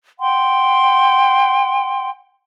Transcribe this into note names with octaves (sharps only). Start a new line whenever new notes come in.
F#5 G5 C6